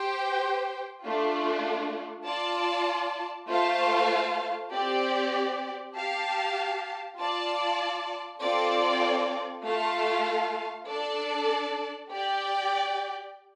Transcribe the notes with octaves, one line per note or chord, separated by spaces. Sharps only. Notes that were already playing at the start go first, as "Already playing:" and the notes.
Already playing: G4 C5 G5
A3 D4 F4
F4 D5 A5
A3 F4 C5 F5 A5
C4 G4 D5
G4 F5 A5
F4 D5 A5
C4 F4 A4 D5
A3 F4 A4 F5 A5
D4 A4 D5 A5
G4 D5 G5